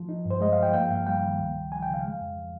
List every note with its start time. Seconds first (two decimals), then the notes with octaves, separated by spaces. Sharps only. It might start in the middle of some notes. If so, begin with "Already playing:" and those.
Already playing: F3
0.09 D#4
0.25 G2
0.30 C5
0.41 G#3 D#5
0.53 F3 F5
0.63 G5
0.73 A#3 G5
0.90 G2 F5
1.07 G3 G5
1.23 D#3
1.40 C#2
1.56 C#2
1.72 F3 G#5
1.83 C#3 G5
1.94 F5
2.04 G#3
2.21 F2
2.37 F3